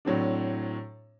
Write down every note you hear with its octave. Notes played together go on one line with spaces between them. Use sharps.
A2 F#3 C4 D4